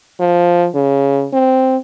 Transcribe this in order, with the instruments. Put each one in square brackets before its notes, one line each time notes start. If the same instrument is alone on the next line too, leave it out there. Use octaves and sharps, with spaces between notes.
[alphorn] F3
C#3
C4